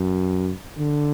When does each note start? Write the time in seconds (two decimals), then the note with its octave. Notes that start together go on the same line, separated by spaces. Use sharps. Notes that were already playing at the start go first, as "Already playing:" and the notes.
Already playing: F#2
0.78 D3